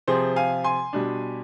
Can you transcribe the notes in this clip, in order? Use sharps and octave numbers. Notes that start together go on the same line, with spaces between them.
C3 F3 C4 G#4 C5
F5 G#5
G#5 C6
B2 G3 D4